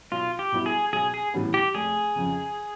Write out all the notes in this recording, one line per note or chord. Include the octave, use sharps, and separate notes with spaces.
B1 F4
G4
B2 G3 B3 E4
G#4
B1 G#4
G#4
A2 E3 G3 B3
G4
F1 G#4
F2 C#3